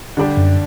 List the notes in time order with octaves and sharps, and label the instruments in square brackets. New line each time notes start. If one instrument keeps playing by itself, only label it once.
[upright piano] D3 G3 D4 G4
[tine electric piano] F#2